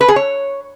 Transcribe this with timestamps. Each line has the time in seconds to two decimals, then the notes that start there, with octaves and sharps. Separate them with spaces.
0.01 B4
0.08 G#4
0.16 C#5